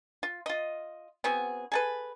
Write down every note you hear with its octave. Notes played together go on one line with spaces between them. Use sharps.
F4
F4 D#5
B3 C4 F#4 G#4
G#4 A4 B4